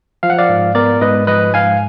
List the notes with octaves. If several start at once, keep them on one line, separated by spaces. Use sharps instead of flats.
F3 F5
F#5
D5 F5
G#2
B3 A#4 D5
G#2 B4 D#5
F3 B4 D#5
G#2 F5 G#5